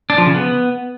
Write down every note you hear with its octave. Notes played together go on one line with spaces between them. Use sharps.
D4
F3
C#3
B3